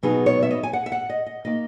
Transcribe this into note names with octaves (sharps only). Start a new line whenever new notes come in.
B2 F#3 B3 D#4 G#4
C#5
E5
D#5
G#5
F#5
E5
F#5
D#5
D#5
D#3 A#3 D#4 D#5